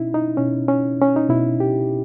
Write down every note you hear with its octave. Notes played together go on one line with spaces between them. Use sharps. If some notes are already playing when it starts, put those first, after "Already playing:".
Already playing: B2 C#4 D#4 E4
D#4
B2 C#4
C#4
C#4
D#4
B2 E4
G4